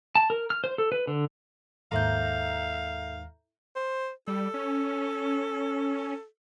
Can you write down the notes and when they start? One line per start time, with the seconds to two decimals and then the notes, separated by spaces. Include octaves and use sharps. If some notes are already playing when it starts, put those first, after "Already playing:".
0.15 A5
0.30 A#4
0.50 F6
0.64 C5
0.78 A4
0.92 B4
1.07 D3
1.92 D#2 G#2 A#3 A4 E5 F5 A#5 G6
3.76 C5
4.28 G3 A4
4.54 C#4